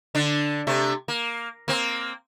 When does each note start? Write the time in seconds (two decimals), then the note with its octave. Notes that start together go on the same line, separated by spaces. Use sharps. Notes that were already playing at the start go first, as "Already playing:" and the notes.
0.15 D3 D4
0.67 C3 A3
1.08 A#3
1.68 A#3 C4